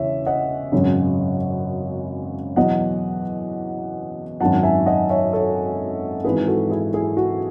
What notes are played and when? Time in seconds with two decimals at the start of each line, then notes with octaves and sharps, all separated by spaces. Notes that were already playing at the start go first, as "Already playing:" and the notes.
Already playing: E1 E2 C#3 C#5 E5
0.26 D#5 F#5
0.72 G#1 F#2 C#3 F#3
2.56 E2 B2 F#3 D#5 F#5
4.40 G#1 F#2 D#3 F#3 F#5 A5
4.63 E5 G#5
4.86 D#5 F#5
5.10 C#5 E5
5.33 A4 C#5
6.24 G#1 G#2 E3 G#4 B4
6.48 F#4 A4
6.70 E4 G#4
6.93 E4 G#4
7.17 F#4